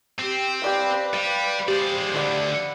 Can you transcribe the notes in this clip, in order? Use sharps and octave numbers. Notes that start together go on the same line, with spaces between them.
C4 G4
G4 B4 D5 F5
G3 F5
G#3 G4 C5 D5
D2 D3 B4 D5 F#5